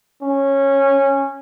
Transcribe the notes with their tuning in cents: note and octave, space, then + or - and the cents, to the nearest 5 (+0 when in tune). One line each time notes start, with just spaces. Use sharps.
C#4 -15